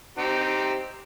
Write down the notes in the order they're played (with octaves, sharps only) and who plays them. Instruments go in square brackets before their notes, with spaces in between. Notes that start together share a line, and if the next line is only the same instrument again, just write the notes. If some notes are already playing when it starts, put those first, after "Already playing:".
[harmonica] C4 D#4 G4